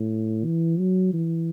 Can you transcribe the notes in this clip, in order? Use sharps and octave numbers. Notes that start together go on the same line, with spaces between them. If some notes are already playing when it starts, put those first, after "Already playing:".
Already playing: A2
E3
F#3
E3